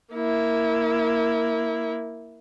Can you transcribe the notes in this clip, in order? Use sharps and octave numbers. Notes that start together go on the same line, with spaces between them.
A#3 E4